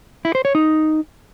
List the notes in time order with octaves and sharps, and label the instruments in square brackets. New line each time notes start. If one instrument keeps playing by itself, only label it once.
[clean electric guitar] E4
C5
C#5
D#4